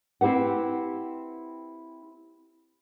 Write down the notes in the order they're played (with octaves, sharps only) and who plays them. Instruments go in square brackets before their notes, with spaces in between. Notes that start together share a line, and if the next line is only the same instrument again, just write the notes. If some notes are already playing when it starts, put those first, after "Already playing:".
[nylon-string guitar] C4 E4 G4 B4 F#5